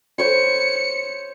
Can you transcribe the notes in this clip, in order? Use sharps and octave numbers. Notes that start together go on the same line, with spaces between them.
C5 C#5 C6 C#7